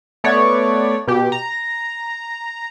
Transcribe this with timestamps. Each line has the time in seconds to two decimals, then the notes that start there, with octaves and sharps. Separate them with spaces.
0.24 A3 B3 C#5 D5
1.08 B2 G4
1.32 A#5